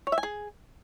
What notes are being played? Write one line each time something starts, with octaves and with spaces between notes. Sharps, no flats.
C#5
E5
G#5
G#4